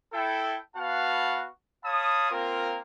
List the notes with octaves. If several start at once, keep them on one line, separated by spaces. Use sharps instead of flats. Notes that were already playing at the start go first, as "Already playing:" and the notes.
E4 A4 G5
B3 F#4 B4 F5 F#5 A5
C#5 F5 A5 B5 D#6
A#3 C4 F4 A#4